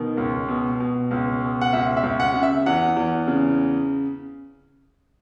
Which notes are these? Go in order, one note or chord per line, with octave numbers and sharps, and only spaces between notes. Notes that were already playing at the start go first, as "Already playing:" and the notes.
Already playing: B2 D#3
C#2
B2
B2
C#2
B2
F#5
C#2 E5
E5
C#2
F#5
C#3
E5
E2 F#5
E2
C#3